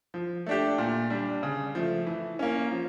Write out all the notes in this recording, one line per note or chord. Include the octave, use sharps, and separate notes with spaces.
F3
A3 D4 G4
A#2
G3 D4
C#3
F3 A3
E3
A#3 C#4
F3